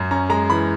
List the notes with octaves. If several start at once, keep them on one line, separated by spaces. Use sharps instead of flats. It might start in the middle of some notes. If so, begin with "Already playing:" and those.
Already playing: F#2
C#4 A#5
G#3 A#5
E3 B5